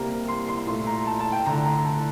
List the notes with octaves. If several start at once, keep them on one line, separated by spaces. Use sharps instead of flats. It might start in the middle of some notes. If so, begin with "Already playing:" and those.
Already playing: C3 G3 A#3 A#5
C6
C6
A#2 A3 C6
A#5
A5
A5
G5
D3 A3 A#5
A#5
A5